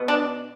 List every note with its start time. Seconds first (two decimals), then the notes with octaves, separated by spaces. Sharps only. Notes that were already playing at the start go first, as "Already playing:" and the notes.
Already playing: B2 B3
0.08 D4